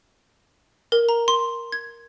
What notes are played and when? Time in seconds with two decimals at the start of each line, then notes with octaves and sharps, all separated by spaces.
0.92 A#4
1.09 A#5
1.28 C6
1.72 G#6